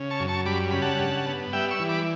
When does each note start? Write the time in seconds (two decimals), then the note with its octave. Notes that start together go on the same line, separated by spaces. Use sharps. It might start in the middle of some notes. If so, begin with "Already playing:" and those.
Already playing: C#3
0.11 A5 C#6
0.20 F#2
0.28 A5 C#6
0.46 G3 B5 D6
0.71 C#3 B5
0.82 F#5 A5
0.99 G2
1.26 B3
1.53 G3 E5 G5
1.71 C#6 E6
1.80 E3
1.89 B5 D6